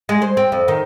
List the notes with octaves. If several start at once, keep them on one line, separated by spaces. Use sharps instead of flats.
G#3
C5
C4
F2
D#3